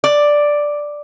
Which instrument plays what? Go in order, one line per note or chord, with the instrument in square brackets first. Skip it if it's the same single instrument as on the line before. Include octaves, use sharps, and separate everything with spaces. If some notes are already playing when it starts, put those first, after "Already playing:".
[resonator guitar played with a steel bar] D5